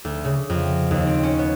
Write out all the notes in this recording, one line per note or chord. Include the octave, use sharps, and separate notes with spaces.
D2
C#3
F2
D#2
C4
C#4
B3